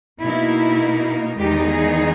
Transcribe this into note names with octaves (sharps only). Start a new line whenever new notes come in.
B2 A#3 D#4 E4
E2 D#3 G#3 D#4 G4
G#4